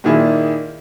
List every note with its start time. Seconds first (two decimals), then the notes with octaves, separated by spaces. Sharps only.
0.04 A#2 D#3 A#3 E4 G#4